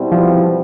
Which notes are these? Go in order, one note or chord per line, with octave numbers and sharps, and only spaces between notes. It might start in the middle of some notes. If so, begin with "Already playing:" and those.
Already playing: B2 G3 C4 E4
F3